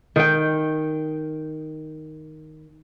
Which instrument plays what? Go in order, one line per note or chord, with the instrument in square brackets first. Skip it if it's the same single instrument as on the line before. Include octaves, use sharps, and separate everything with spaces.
[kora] D#3 G5